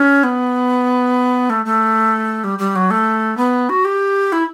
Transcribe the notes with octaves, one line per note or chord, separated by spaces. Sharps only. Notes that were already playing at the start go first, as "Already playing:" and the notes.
Already playing: C#4
B3
A3
A3
G3
G3
F#3
A3
B3
F#4
G4
E4